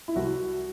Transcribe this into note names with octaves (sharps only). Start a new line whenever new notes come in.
E4
C2 F#4